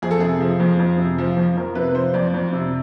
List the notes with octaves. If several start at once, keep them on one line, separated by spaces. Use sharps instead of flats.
F2 G#4
A4
C3 G#4
F3
F2
F2
C3
F3
F2
F2 A#4
C3 B4
F3 C5
F2 D5
F2
C3